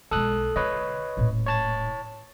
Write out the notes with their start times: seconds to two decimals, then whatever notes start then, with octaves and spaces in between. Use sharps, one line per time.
0.11 B1 G#3 A4 D#6 F#6
0.56 D3 B4 C#5 D#5
1.17 D#1 A2
1.46 C#5 A5 A6